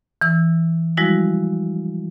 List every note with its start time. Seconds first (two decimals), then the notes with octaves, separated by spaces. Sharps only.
0.21 E3 E6
0.97 F3 G3 G#3 E4 F#4